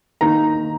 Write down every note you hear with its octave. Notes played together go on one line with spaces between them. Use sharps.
D#3 A#3 D#4 A#5